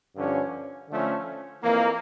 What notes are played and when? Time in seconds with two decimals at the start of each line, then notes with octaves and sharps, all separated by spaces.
0.15 G2 D3 F3 C#4
0.89 D3 F3 A3 C#4
1.63 F2 E3 A#3